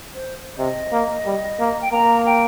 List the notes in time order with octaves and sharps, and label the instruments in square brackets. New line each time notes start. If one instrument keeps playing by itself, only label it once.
[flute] C5
[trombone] C3 [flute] D#5
[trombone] A#3
G3
A#3
[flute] G5
[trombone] A#3 [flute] A#5
[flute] G5